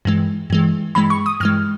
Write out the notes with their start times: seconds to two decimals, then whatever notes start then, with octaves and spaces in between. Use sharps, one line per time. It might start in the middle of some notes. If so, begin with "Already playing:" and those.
0.05 G2 E3 G#3
0.50 G2 E3 G#3
0.95 G2 E3 G#3 B5
1.10 C#6
1.26 D#6
1.40 G2 E3 G#3 F6